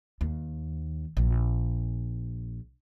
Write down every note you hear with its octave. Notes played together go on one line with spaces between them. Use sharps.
D#2
A#1